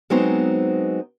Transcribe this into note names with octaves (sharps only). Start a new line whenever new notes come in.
F#3 G#3 B3 C4 D#4 C5